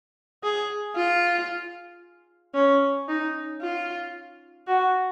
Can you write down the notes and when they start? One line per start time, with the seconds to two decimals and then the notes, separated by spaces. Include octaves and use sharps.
0.43 G#4
0.96 F4
2.55 C#4
3.09 D#4
3.62 F4
4.67 F#4